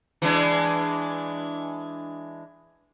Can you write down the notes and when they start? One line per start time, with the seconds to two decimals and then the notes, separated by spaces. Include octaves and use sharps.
0.22 E3 G#3 D4